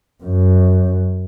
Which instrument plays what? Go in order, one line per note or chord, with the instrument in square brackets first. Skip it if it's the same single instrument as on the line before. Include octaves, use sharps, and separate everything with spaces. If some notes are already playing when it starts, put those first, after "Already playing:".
[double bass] F#2